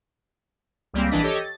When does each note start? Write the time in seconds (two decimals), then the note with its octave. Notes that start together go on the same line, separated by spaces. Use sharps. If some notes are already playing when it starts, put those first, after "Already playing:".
0.93 C#2 G3 A#3 C4
1.10 A#1 E3 D4 D#5 B6
1.23 G4 A4 C#5 D#5
1.42 A6